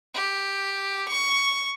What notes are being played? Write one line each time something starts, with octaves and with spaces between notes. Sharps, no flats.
G4
C#6